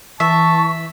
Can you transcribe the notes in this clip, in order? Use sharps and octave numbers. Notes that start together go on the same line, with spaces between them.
E3 E5 A5 C#6